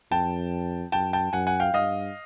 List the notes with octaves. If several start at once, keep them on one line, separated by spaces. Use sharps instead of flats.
F2 G5 A5
F#2 G5 A5
G5 A5
F#2 F#5 G#5
F#5 G#5
F5 G5
G2 D#5 F5